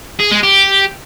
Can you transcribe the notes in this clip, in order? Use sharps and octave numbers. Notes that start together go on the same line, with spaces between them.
G#4
G#3
G4